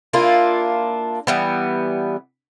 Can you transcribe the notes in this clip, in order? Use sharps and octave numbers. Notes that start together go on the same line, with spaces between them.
A#3 D4 E4 F4
E3 G3 B3